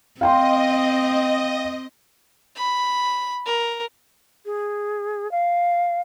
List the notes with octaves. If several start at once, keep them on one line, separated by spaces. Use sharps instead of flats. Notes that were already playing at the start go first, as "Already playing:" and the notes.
C4 D#5 F5 G5 C6
B5
A#4
G#4
F5